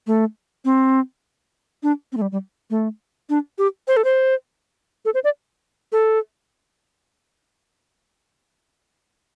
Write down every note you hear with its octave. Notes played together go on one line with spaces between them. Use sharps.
A3
C4
D4
C4
A3
G3
G3
A3
D4
G4
C5
A4
C5
A4
C5
D5
A4